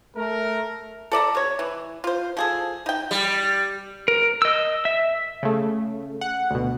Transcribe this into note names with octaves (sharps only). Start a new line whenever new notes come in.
A3 A#4
A4 D5 E5 A#5
C3 C#5
E3
F4 C5
F3 G#4 A4
D#4 G5
G3
A#4
D#5 E6
E5
C#3 A3
F#5
D2 B2